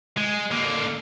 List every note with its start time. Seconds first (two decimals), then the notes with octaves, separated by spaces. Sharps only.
0.17 G#3
0.52 D3 A#3